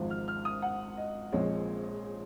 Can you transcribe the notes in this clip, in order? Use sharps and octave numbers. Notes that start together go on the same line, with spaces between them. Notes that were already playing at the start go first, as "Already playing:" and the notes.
Already playing: G#1 G#2 F3
F6
F6
D#6
F#5
D#5
A#1 A#2 F3 G#3 C4 C#5